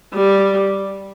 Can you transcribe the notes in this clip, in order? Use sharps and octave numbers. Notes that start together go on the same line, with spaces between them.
G3